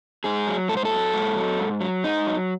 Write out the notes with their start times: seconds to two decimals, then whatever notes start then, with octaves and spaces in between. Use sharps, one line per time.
0.24 G#2 G#4
0.47 F#3
0.69 G#2 A4
0.77 C5
0.85 A4
0.92 F#3
1.14 G#2
1.36 F#3
1.59 G#2
1.81 F#3
2.04 G#2 D#4
2.27 F#3